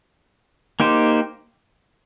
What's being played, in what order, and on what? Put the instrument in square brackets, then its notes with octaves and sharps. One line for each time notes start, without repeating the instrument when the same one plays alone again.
[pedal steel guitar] A#3 D#4 G4 C5